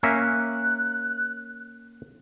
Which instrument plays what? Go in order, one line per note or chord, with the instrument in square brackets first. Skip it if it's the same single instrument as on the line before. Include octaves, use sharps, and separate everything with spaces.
[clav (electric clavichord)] A#3 C#4 E5 [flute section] F#6